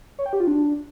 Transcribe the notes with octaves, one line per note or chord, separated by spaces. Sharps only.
C#5
G5
G4
F4
D4